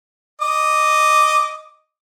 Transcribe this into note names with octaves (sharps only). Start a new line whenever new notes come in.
D#5 D6